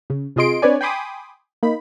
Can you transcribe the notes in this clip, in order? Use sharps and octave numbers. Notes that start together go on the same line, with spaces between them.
C#3
C3 F4 G#4 D#5 C6 D7
C4 D4 B4 C#5 D5 G#5
G5 G#5 B5 C6 D6 D#6
A#3 D#4 B5